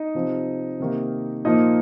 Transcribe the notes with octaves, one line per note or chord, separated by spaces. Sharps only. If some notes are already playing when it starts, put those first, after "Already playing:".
Already playing: D#4 D#5
C3 F3 C4
C3 D#3 A#3
A#2 F3 A#3 D#4 D#5